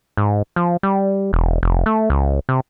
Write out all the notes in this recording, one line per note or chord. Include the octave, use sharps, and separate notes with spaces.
G#2
F3
G3
E1
F1
A3
C#2
C3